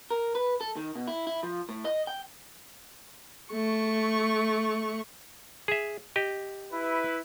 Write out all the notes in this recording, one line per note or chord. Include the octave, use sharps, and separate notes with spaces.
A#4
B4
A4
D#3
B2
E4
E4
F3
A2
D#5
G5
A3 C#6
G#4 E5
G4 D#5
E4 B4